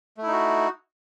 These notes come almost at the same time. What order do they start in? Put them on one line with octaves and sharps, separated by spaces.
A3 E4 D#4 F#4